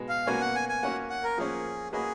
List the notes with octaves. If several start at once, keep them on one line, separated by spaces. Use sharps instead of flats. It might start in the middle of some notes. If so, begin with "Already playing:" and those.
Already playing: B2 G#3 B3
F5
B2 A#3 C#4 F#4 G#5
F#5
G#5
G#5
A#3 C#4 F#4 F#5
F#5
A#4
F3 A#3 C#4 G#4
A#3 C#4 F#4 G#4 B4 D#5